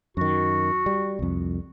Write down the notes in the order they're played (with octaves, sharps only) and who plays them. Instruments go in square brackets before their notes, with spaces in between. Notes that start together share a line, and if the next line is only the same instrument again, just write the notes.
[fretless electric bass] F#2 D#3 [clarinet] F#4
[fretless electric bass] G3
C2 F2